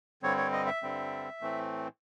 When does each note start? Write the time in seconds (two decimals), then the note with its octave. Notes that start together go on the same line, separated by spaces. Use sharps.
0.23 G2 D3 G3 C4 C#5
0.37 C#5
0.52 D#5
0.67 E5
0.82 G2 D3 G3 C4
1.41 A2 E3 A3 C4